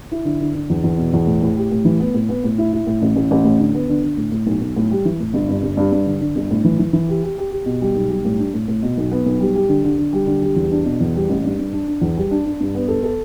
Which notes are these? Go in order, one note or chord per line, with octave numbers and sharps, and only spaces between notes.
E4
D3
D3
D3
E2
E2
B2
E2
A2
A2
G4
A2
E3
B3
A2
B3
A2
E4
E4
A2
A1
A1
A1
A2
D3
B3
D3
D3
A2
A2
B1
B1
A2
G3
E3
A2
G1
G2
G1
G2
G2
D3
D3
G1
A2
E3
E3
E3
G4
G4
G4
G4
B2
G3
B1
G3
A2
D4
A2
A2
B2
B1
B3
B1
G3
G4
D3
D3
D3
G3
D3
G3
E2
D4
B2
E2
G3
A1
G2
G2
D4
D4
E2
G3
D4
D4
G2
B3
A4
A4